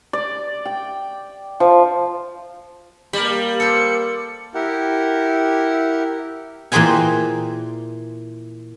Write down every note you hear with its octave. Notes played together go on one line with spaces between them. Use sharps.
D5
G5
F3
G3 A#3 A#4 A5 B5
A4 C5 C#7
E4 G4 A#4 F#5
A#2 E3 G#4 C5 G5 G#5